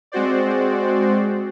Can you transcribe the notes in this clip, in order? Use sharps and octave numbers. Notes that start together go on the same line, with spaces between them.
G#3 C4 F#4 C5 D5